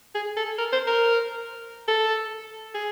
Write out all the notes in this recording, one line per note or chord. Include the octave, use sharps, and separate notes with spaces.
G#4
A4
A#4
C5
A#4
A4
G#4